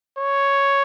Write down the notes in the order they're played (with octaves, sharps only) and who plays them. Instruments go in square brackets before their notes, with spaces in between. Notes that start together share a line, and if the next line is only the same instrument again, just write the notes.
[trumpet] C#5